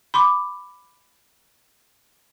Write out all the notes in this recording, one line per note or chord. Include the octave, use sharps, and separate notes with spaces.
B5 C6 D6